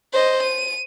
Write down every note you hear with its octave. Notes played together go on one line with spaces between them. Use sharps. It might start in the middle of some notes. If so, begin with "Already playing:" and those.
C5 D#5
D#7